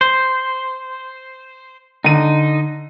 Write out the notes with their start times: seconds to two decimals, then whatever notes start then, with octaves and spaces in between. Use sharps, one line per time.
0.01 C5
2.04 D3 D#4 D#7